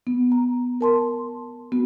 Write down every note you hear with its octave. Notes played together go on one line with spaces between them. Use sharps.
B3
A#5
A#4 A5 C6
B3 F#4